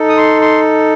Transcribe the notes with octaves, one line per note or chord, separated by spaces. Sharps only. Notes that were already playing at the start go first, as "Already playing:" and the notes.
Already playing: D#4 A4
D#6
C6
C6